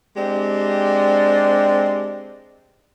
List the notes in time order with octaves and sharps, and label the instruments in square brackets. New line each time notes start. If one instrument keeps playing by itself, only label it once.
[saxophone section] G#3 C4 D4 G4